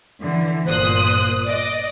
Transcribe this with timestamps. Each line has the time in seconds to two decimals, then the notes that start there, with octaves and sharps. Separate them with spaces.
0.21 D3 E3
0.65 G1 A#2 C5 D#6 F#6
1.45 D5 D#5